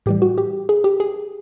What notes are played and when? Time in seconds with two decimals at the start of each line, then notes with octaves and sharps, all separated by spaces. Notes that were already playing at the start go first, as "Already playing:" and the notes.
0.06 A2 E3 G3 G4
0.22 F#4
0.38 G4
0.69 G#4
0.84 G4
1.00 G#4